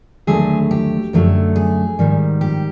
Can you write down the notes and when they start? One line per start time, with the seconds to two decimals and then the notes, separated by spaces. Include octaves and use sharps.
0.27 D#2 D3 F#3 A3 G#4
0.71 G4
1.13 F#2 D3 F#3 A3
1.56 G#4
1.99 G#2 D#3 G3
2.41 G4